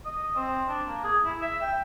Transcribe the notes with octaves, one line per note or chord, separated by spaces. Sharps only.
D#5
C4
D4
A#3
G#4
E4
E5
G5